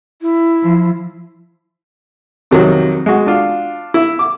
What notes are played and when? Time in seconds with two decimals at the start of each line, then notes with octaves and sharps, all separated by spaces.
0.22 E4
0.62 F3
2.51 F2 C3 D#3 F#3
3.06 G#3 F#4
3.26 D4 F4
3.94 E4
4.19 D6